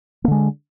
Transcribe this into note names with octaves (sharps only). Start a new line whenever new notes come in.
D3 G#3 A#3